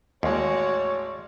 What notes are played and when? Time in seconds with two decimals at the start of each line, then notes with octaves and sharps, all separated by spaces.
0.23 A1 D#2 G#3 F#4 C#5 D5